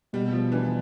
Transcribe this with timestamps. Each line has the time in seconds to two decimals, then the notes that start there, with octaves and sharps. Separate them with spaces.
0.13 B2 G3
0.32 F3
0.52 E3 D4